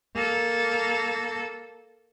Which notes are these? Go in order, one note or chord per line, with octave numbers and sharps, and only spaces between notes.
A#3 A4